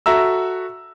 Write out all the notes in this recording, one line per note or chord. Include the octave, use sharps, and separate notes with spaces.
F#4 A4 E5 A#5 E6